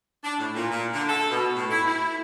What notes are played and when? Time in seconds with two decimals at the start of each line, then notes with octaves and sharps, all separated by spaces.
0.24 D4
0.39 A2
0.55 A#2
0.71 A#2
0.94 D3
1.09 A4
1.30 B2
1.56 A2
1.71 E4
1.87 E4